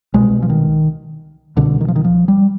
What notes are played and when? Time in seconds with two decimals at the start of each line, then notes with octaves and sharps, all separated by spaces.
0.14 C2 B2 G#3
0.42 F3
0.50 D#3
1.57 C2 B2 D3
1.81 D#3
1.88 F3
1.96 D#3
2.04 F3
2.28 G3